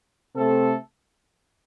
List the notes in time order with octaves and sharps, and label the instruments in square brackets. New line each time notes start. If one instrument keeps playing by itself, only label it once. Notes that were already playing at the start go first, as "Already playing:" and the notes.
[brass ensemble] C3 A3 C4 A4